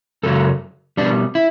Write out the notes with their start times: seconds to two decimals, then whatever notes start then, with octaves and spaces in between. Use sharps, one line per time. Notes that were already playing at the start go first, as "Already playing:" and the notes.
0.23 F#2 C#3 F#3 A4
0.97 B2 G3 D4
1.35 E4